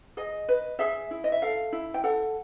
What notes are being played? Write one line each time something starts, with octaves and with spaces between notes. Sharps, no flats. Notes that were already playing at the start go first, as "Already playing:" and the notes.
G#4 D#5
B4
G#4 E5
E4
D#5
E5
A4 F5
E4
G5
A4 F#5